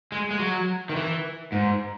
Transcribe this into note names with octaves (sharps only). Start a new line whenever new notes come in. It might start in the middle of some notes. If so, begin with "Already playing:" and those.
G#3
G#3
F#3
D#3
E3
G#2